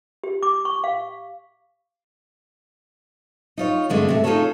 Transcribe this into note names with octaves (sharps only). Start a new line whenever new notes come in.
G4
D6
C#6
F5
D#4 F4 C#5
G2 D3 G#3 A3 C4
C3 A3
D#4 F4 F#4 G#4 A4 C#5